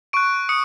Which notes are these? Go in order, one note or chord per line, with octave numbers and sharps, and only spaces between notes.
C#6 F#6 D7
D#6 C#7